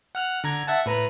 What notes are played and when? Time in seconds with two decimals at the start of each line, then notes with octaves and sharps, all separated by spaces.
0.15 F#5 F6 F#6
0.44 D3 A#5 G#6
0.67 E5 F#5 A5
0.86 A2 B4 A#5